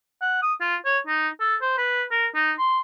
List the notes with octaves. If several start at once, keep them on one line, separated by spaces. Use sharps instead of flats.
F#5
D#6
F4
C#5
D#4
A4
C5
B4
A#4
D#4
C6